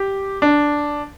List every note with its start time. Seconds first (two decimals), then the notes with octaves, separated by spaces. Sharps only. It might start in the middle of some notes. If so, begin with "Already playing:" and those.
Already playing: G4
0.42 D4